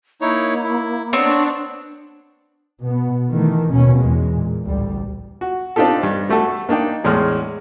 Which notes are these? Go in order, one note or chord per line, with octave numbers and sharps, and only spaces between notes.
A#3 D#4 E4 C#5
E4
B3 C4 D4 C#5
B2 B3
D#3 E3 A3
D#2 B2 C#4
E2 G#3
A#2
A1 D2 G3
F#4
C4 D4 D#4 F4 G4 A4
G2
G3 A3 F#4 A4
A#3 D4 D#4 G5
E2 A2 G#3 C6 F6